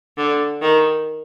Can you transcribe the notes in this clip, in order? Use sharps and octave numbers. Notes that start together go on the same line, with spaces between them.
D3
D#3